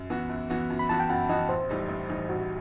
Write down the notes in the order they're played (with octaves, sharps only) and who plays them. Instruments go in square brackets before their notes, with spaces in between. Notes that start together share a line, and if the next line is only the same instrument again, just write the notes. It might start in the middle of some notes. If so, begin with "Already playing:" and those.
Already playing: [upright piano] F#2
E3 B3 F#4
F#2
E3 B3 F#4
F#2
[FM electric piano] B5
[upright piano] E3 B3 F#4 [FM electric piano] A5
[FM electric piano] G5
[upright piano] F#2 [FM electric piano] F#5
[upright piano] E3 B3 F#4 [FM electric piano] D#5
[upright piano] A1 [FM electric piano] C5
[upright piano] A2 E3 G3 D#4
A1
A2 E3 G3 D#4
[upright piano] A1 [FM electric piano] F#4